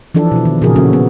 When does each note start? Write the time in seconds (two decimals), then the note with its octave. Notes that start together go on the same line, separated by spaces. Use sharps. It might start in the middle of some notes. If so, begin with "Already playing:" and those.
0.15 E3 F3 D4 A4
0.32 B2 E4
0.45 D#3
0.62 A#2 C#3 F3 F#4 G#4 A#4
0.76 C#3 F3 A#3 C#4 F#4 A4
0.93 B3